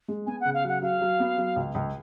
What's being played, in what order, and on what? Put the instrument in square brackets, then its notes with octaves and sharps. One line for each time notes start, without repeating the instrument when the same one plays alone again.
[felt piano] G#3
[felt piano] B3 [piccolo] G#5
[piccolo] F#5
[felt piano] C#3
[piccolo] F5
[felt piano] F#3 [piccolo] F#5
[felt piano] F#3 [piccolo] F5
[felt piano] F#3
B3
F#3
C#2
C#2